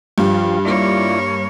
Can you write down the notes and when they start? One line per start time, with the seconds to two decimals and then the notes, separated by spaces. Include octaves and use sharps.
0.18 G2 F3 F4 G4
0.65 A#3 E4 F4 C#5 D5